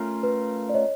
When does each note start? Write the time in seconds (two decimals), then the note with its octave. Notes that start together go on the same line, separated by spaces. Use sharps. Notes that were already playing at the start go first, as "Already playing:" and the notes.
Already playing: A3 C#4 F4 A#4
0.23 B4
0.69 D5
0.74 C#5 D#5